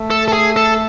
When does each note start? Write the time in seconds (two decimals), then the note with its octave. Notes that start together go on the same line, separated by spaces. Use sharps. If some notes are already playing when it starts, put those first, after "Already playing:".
Already playing: A3
0.10 A4
0.28 A4
0.33 G#4
0.56 A4